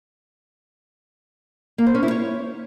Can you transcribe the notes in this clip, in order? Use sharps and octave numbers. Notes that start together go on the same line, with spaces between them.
A#3
C5
C#4
E4
C#5